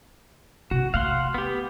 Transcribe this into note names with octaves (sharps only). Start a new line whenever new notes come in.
C3 F#4
A3 F5 F#5 C6
B3 G4